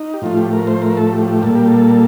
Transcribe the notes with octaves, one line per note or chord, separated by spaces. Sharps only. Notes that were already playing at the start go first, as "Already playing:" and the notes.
Already playing: D#4
G4
A2 F3 A3 F4
G4
A#4
C5
A#4
A4
G4
G4
A#2 G3 A#3 A4
G4
A4